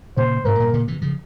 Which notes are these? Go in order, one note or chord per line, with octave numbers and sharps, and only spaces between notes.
A#2 C#3 C5
G#2 C3 A#4
G2 A#2
A#2 C#3
C3 E3
C#3 F3